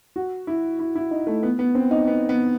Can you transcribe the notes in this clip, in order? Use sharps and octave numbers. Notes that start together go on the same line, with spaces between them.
F#4
E4
E4
E4
D#4
A3
B3
B3
C4
D#4
B3
B3